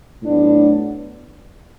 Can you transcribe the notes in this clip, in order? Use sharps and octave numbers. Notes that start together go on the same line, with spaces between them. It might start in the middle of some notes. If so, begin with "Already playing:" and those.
A2 F#3 B3 D4